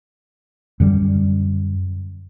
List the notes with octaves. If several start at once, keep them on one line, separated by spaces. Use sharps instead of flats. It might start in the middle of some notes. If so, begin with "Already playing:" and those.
F#2 D3 G3